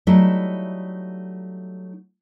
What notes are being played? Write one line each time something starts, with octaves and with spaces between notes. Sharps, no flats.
F#3 G3 A3 D#4 E4